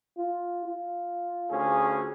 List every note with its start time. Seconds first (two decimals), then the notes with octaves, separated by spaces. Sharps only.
0.17 F4
0.66 F4
1.50 D2 C#4 G#4